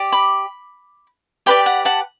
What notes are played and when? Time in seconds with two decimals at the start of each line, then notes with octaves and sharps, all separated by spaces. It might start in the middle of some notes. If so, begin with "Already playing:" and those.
Already playing: G4 D5
0.12 B5 D6
1.46 G4 B4 D5 G5 B5
1.66 F#5
1.85 F#5 A5